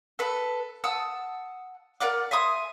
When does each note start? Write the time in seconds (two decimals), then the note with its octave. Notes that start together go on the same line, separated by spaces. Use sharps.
0.19 A4 B4
0.84 F#5 A5 D#6 E6
2.00 A#4 D5 F#5 D6
2.31 E5 G#5 C6 D#6